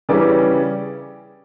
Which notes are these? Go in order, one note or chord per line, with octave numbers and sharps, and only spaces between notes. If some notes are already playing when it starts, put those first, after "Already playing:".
C#3 E3 G3 C#4 D5